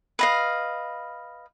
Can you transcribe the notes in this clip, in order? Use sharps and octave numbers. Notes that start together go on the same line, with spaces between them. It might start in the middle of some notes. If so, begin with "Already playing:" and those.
B4 D#5 F5